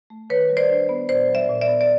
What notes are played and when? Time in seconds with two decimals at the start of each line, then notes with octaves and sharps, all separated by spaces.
0.10 A3
0.30 D#3 B4 C#5
0.49 G3
0.57 C5 D5
0.69 D4
0.89 B3
1.09 A#2 C5 D5
1.29 F#3
1.35 D5 E5
1.49 A#2
1.61 D5 E5
1.68 B3
1.81 D5